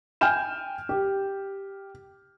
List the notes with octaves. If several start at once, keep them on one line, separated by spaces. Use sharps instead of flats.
G5 G#5 F6 G6 E7
G4